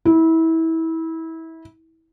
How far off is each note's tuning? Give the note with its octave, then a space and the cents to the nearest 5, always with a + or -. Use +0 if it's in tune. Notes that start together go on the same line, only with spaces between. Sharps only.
E4 -25